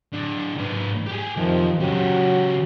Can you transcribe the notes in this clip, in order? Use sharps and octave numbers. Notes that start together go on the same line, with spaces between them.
A2 D4
G#2 B4
G4 G#4
F2 C3 D#3 F3
C#3 F#3 F#4 G4